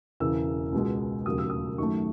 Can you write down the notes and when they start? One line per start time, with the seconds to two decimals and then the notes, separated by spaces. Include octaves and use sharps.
0.20 E1 E2 C#3 E3 E6
0.73 C#2 B2 G#3
1.25 E1 D#2 C#3 F#3 A3 D#6
1.38 E6
1.50 D#6
1.78 F#2 D#3 F#3 A3 C#6